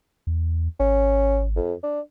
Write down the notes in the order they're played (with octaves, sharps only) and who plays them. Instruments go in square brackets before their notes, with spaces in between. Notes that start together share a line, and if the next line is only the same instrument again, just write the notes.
[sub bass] E2
[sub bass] G#1 [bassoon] C#4
[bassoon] F2
D4